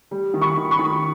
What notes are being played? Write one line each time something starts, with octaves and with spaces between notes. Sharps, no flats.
G3
D#3
B5 C#6
D#3
B5 C#6
D#3